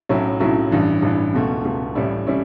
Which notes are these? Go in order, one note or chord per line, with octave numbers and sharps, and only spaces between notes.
B1 A2 F#3 C#4 E4
B1 A2 F#3 C#4 E4
A1 G2 E3
A1 G2 E3
C#2 B2 A3
C#2 B2 A3
A1 A2 G3 C#4 E4
A2 G3 C#4 E4